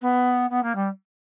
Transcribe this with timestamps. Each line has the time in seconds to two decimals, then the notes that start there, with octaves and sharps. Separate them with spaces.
0.01 B3
0.50 B3
0.63 A#3
0.75 G3